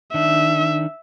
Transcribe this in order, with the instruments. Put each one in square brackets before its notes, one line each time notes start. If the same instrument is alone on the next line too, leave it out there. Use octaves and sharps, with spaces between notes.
[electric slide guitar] D#3 D4 [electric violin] E5